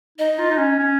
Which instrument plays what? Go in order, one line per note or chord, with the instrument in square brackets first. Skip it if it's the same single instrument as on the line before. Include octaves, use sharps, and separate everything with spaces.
[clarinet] D#4 [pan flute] D#5
[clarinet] F4
D#4
C#4
C#4